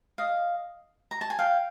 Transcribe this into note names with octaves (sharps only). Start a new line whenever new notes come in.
D#5 F5
A#5
A5
G#5
F5 G5